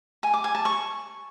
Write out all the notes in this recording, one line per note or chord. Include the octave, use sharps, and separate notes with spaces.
G#5
D6
G#5
A5
C#6